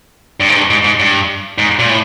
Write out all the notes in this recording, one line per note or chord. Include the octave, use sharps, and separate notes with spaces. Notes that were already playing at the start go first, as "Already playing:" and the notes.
G2
G#2
G2
G#2
G#2
G2
G#2
A#2
A2